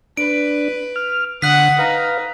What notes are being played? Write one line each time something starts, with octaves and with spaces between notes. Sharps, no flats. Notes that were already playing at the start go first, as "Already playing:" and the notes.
D4 B4 D7
F6
D3 F#5 D#6 F#6 B6
D#4 B4 F5